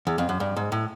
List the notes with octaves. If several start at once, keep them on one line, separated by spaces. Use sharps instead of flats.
E2
F2
F#2
G2
G#2
A2